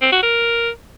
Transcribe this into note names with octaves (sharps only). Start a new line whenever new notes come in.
C4
F#4
A#4